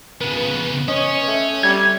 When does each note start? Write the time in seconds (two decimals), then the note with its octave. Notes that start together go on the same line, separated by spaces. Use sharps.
0.21 C#3 B3 B4
0.88 C#4 C#5 D#5
1.28 A3
1.63 G3 G#6